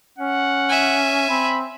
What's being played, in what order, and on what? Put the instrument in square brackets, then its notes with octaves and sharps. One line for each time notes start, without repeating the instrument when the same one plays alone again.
[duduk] C#4 [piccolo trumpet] F#5
[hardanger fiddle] E5 G#5
[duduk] C4 [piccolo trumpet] B5